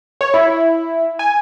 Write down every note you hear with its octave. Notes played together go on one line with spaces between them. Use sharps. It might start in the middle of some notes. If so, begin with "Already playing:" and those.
C#5
E4
G#5